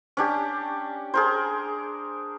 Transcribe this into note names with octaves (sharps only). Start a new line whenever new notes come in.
C#4 D4 G4
G#4 A#4 C5